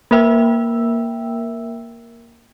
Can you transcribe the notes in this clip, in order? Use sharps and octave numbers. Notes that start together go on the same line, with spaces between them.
A#3 A#4 E5 G5 E6